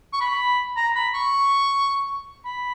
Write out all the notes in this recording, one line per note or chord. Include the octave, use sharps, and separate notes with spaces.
C#6
B5
A#5
B5
C#6
B5